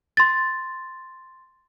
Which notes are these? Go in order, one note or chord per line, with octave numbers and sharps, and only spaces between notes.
C6 A6